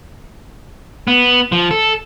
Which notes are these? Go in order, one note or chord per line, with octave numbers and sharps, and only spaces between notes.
B3
F3
A4